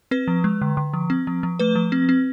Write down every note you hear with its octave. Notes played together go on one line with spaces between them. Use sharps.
C4 B4
F3
G#3
D3
D3
F3
C4
F3
F3
A3 B4
F3
C4
C4